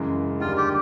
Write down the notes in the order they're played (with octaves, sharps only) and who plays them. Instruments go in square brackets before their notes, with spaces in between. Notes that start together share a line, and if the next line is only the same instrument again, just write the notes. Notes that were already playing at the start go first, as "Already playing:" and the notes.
Already playing: [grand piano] F#2 C#3 E3 G#3
[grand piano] D#2 D3 G3 [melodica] F4
[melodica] G4